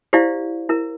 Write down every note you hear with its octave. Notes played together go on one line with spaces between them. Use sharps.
E4 G4 C5 D5 F5
E4 A#4